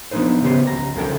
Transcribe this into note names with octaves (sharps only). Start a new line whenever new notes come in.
F3 B3 D4 D#4 B4 C5
C#3 B3 G4 B4 C5
C#2 A#5
C2 C#3 F3 A4 G5